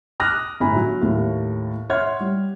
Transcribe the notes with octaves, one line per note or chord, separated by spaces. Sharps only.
D6 D#6 F6 F#6 A#6
G1 A2 G#5 A#5 B5
F#3
D#2 A2
C#5 E5 F#5 C6 F6 G#6
G3